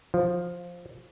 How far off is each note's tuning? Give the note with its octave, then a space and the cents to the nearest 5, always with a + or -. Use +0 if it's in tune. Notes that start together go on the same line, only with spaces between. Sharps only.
F3 +5